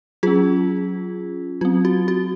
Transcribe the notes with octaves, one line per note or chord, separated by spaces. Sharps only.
F#3 C#4 F4 G#4
F#3 C4 F4
F#4
F#4